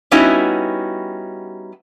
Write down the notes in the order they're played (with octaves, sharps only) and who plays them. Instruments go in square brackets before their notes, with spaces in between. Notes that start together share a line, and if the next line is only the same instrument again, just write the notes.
[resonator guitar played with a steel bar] G3 B3 C#4 D#4 E4 F#4